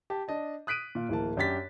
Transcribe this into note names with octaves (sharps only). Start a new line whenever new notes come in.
G4 A5
D4 D#5 A5
D#6 F#6 B6 D7 D#7
A#2 F5
D1 E3 A#3 A5
F#2 D4 G4 A6 B6